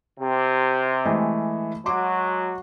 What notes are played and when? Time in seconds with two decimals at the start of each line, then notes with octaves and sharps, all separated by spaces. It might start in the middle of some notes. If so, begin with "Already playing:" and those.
0.19 C3
1.05 E3 G#3 A3
1.86 F#3 G#3 F#4 C6 D6